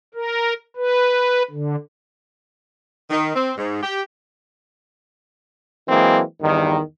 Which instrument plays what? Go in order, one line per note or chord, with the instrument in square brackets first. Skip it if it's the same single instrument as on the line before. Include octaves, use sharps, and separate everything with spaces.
[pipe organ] A#4
B4
D3
[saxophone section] D#3
C4
G#2
G4
[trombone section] E3 F#3 G#3 A#3 C4
E2 G2 D#3